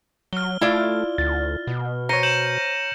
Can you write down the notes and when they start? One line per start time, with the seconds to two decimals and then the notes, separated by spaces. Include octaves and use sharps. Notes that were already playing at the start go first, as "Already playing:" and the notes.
0.33 F#3 F6 G7
0.61 A3 E4 F4 D5
1.18 D2 A6
1.67 B2
2.09 C5 C#5 A#5 A#6 C#7 D#7
2.23 G6 E7 F#7